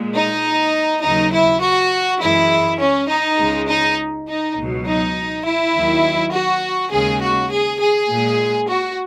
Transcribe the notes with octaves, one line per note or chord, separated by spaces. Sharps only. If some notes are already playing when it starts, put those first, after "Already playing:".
Already playing: A#2 G#3
D#4
D#2 C#3 F#3 D#4
E4
F#4
F#2 E3 G#3 E4
C#4
D#4
C#2 C#3 G#3
D#4
D#4
C#2 B2 F#3
D#4
E4
D#2 D#3 F#3
F#4
D#2 C#3 G#3 G#4
F#4
G#4
G#4
A#2 G#3
F#4